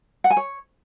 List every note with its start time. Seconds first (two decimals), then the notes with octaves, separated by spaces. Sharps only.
0.24 F#5
0.30 G#5
0.37 C#5